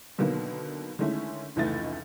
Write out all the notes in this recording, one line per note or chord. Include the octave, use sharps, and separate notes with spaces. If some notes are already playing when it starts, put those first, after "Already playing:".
B2 D3 D#3 F#3 A#3 B3
D3 D#3 G#3 A3 C#4 E4
F1 C#2 E3 A3 D#4 A6